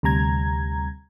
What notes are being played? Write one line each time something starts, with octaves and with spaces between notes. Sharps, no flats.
D2 C3 G3 A#5 G#6